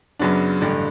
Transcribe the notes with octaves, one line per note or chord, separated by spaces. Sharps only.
F#2 C#3 F#3 B3 D4
A1 G2 D3